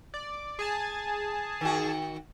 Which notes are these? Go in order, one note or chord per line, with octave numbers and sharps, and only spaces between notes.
D5
G#4 G#5 A5
D#3 F#4